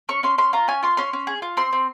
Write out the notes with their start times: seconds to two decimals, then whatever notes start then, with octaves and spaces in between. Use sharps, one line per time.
0.09 C#4 C#6
0.23 C#4 C6
0.38 C#4 C6
0.53 F4 A#5
0.68 C#4 G#5
0.83 F4 C6
0.97 C#4 C6
1.13 C#4
1.27 G#4
1.42 F4
1.57 C4 C6
1.73 C4